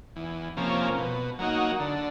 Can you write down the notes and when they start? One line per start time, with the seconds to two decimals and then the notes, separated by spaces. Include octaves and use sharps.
0.16 E2
0.57 C3 F3 A#3 C#4
0.98 B2
1.39 F#3 A#3 D#4 F#4
1.80 D3